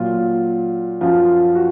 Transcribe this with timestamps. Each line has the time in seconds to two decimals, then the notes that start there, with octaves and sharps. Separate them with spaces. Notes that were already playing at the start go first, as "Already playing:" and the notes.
Already playing: A#2 F#3 F4
1.01 F#2 F3 F4
1.55 F#4